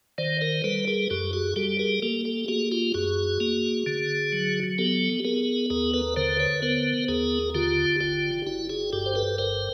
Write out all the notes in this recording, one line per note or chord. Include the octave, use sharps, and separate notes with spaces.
D#3 C5 D5
A#4 C5
G3 A4 B4
G#4 A#4
F#2 G4 A4
F#4 G#4
G3 G4 A4
G#4 A#4
A#3 G4 A4
G4 A4
A#3 F#4 G#4
F4 G4
F#2 F#4 G#4
A#3
D3
F#3
B3 G4 A4
B3 G#4 A#4
D#2 G#4 A#4
A4 B4
D3 A#4 C5
B4 C#5
B3 A#4 C5
D#2 G#4 A#4
D3 F4 G4
G1 F4 G4
G1 E4 F#4
F#4 G#4
G2 G4 A4
C5
A4 B4
G1 A#4 C5